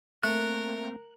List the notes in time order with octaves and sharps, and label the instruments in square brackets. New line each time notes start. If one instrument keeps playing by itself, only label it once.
[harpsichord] A3 [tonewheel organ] A#3 C4 [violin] A#4 [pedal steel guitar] F#6